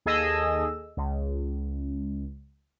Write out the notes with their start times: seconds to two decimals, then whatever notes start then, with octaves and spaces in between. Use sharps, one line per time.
0.06 D#2 G#4 A4 D#5 E6
0.97 C#2